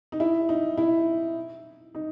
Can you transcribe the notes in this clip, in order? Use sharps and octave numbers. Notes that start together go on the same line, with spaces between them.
D#4
E4
D#4
E4
D#4